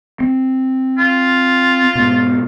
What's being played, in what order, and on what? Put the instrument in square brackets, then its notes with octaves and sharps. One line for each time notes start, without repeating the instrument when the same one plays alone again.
[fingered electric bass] C4
[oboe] F4
[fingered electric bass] G#2 B2